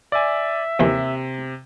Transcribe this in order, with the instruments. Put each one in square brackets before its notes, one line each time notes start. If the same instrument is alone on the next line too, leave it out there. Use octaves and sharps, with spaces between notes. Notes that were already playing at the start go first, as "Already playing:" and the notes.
[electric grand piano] D5 G#5 [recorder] E5
[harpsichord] D#2 E3 B5 [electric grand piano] C3